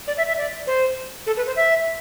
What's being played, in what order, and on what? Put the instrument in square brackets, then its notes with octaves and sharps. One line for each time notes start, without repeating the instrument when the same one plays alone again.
[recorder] D5
E5
E5
D5
C5
A4
B4
C5
E5